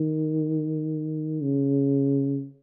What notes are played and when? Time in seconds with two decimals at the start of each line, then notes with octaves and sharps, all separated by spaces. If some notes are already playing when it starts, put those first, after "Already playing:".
Already playing: D#3
1.41 C#3